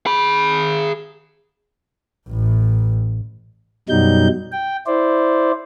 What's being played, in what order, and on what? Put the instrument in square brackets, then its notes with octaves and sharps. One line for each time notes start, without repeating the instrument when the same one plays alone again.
[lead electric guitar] G#4 B5
[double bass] A1 A2
[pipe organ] F#2 B2 F#3 G3 D#4 G6
G5
E4 C5 D5